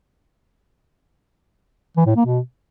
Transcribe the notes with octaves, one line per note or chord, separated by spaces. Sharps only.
E3
A2
A#3
B2